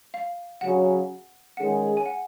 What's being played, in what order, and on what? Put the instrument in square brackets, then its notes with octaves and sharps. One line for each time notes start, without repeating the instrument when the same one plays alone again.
[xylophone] F5
[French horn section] C#3 F#3 C#4 [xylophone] F#5
[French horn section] D#3 G#3 C#4 G#4 [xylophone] F#5
[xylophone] G#5
F#5